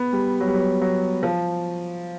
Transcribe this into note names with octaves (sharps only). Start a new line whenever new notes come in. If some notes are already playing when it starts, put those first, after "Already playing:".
Already playing: B3
G3
F#3
G3
F#3
F#3
F3